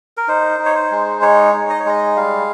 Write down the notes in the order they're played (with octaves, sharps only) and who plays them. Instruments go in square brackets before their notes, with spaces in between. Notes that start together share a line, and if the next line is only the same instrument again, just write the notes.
[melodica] A#4
D#4 C5
D#4
C#5
C5
G#3
D#4 C#5
D#4
D#5
C#5
G#3 D#5
G3 F5